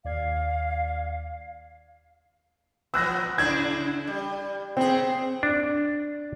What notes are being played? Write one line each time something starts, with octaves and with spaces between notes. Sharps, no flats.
D#2 D5 F5 G#6
F3 B3 E6 F#6 A#6
C#3 D4 E4 G#6
G3
C#3 C4 G#4
D4